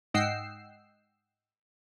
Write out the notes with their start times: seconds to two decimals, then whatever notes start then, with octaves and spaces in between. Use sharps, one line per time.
0.14 G#2 D#5 F#5 G5 E6 C7